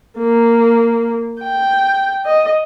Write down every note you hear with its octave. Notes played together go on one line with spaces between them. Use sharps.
A#3
G5
D#5